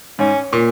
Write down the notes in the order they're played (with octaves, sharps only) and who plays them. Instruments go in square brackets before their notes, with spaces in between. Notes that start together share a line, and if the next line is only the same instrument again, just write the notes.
[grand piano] G#2 [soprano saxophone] C#4
[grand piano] A#2